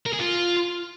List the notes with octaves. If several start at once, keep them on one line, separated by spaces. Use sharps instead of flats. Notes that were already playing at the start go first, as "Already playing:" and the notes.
A#4
G#4
F4